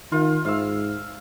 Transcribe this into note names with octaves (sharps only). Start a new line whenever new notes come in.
D#3 F4
G#2 F5 E6